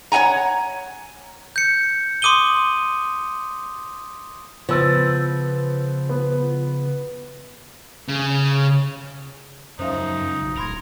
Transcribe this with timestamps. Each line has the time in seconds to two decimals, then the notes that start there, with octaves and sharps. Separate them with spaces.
0.12 C#5 D#5 F#5 G#5 A#5
1.56 G6 C#7
2.22 C6 D6 D#6 D#7 G7
4.69 C#3 F3 B3 E6 A6
6.10 B3
8.08 C#3
9.79 C#2 F#2 F3 D#4 C5 E5 F5
10.42 B1
10.58 D1 A#4 B5 C6 G#6